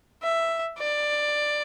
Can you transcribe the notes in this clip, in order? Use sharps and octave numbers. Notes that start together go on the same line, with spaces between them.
E5
D5